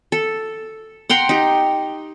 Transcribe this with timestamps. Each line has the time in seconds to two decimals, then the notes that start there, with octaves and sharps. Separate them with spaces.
0.12 A4
1.10 F#5 G5 A#5 C6
1.29 D#4 G4